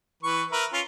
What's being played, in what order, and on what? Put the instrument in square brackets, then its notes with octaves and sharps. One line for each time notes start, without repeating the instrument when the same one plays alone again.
[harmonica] E3 B4 C#6
A#4 B4 E5
C#4 F4